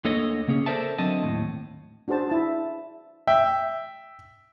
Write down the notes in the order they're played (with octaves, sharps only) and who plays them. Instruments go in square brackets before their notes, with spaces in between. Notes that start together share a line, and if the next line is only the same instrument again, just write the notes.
[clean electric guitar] D2 D3 A#3 A4 C#5 D#5
C#3 A#3 C#4 G#4
A4 A#4 C5 D5 E5 A5
D3 F#3 C4 D#5 A5
D#2 A2
[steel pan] D4 F#4 G#4 C5 A5
E4 A5
[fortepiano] E5 G5